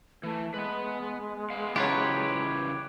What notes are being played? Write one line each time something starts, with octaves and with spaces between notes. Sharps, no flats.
E3 A3
G#3 B3 B4
B3 F5
C#3 E3 F#3 F4 G4 B4 C#5